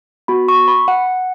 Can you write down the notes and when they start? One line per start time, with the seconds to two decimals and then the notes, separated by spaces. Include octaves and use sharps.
0.28 B3 F#4 B5
0.48 C#6
0.68 B5
0.88 F#5